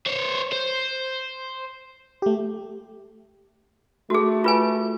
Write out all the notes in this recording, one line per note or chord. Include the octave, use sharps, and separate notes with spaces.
C5 C#5
C5
A3 G4
A3 F#4 G#4
F4 B4 G#5